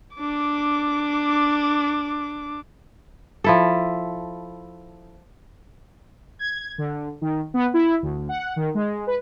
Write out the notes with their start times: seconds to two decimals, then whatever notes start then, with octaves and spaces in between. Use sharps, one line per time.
0.16 D4 D6
3.44 F3 E4 A4
6.39 G#6
6.78 D3
7.21 D#3
7.54 B3
7.74 E4
8.02 D2
8.29 F#5
8.56 D#3
8.75 G#3
9.07 B4